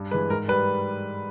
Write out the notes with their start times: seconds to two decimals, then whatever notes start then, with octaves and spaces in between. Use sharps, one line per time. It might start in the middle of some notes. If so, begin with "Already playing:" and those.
Already playing: G2
0.11 G#3 B4
0.14 E3
0.30 G#2 A#4
0.48 G3 B4